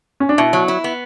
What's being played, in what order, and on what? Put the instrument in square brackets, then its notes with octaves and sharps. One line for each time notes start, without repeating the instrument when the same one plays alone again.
[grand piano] C#4
D4
[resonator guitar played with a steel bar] B2 [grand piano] E4
[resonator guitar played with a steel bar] F#3
E4
B3